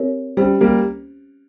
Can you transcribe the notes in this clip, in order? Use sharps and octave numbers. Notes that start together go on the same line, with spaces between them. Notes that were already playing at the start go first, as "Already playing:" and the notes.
Already playing: C4 G4 A#4 C#5
G3 C#4 G4 C5
G3 A#3